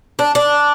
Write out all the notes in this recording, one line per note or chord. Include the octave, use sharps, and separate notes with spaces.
D4
D4